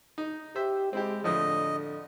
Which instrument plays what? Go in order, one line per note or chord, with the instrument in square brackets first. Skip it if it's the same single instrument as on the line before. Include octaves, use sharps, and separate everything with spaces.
[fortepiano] D#4
[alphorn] G4 [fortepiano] C5 E5
[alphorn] G#3 [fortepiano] C4 E4 G4
[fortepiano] F2 A2 F3 [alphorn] D3 [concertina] D#5